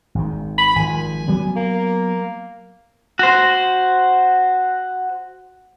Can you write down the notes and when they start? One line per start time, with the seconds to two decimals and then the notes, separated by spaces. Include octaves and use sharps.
0.15 G#1 D#3
0.58 B5
0.76 G#1 F3 G#5
1.28 F#3 G3 B3
1.56 A#3
3.19 F#4 C5